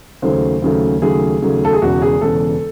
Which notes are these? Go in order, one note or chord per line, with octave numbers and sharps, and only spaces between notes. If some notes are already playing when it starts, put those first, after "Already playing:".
D#2 C#3 F#3 A3 C5
D#2 C#3 F#3 A3
D#2 C#3 F#3 A3 G#4
D#2 C#3 F#3 A3
A4
G#4
E1 E2 C#3 F#4
G#4
E1 E2 C#3 A4